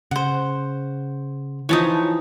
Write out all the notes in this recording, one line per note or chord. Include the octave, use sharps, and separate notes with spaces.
C#3 C5 F#5
E3 F3 D#4 C#5 A5 D#6